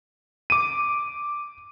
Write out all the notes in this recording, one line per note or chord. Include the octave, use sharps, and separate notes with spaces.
D6 D#7